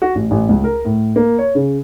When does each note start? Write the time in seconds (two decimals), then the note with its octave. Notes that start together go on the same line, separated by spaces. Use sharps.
0.02 F#4
0.15 A1
0.31 A1
0.49 C#2
0.64 A#4
0.85 A2
1.16 A#3
1.38 C#5
1.55 C#3